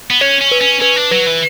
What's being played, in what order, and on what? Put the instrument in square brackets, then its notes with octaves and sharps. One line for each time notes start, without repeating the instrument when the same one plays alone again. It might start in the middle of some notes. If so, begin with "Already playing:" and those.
[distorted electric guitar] B3
[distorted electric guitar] C#4 [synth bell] C#5
[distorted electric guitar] C#4
[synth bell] B4
[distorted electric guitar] C#4
[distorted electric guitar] C#4 [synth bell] B4
[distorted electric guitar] D4
[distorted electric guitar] F#3 [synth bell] B4
[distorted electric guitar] E3